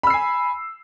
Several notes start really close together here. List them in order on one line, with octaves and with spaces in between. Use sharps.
B5 E6 C7 G#5